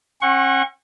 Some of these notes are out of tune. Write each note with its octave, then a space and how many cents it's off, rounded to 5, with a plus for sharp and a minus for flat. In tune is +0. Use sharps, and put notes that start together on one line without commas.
C#4 -45 F#5 +0 C#6 -30